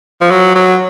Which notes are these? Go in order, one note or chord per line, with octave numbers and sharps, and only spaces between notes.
F3
F#3
F#3